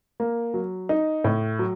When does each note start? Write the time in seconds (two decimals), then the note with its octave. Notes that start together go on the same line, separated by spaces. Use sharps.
0.20 A#3
0.54 F#3
0.89 D#4
1.24 A2
1.59 F#3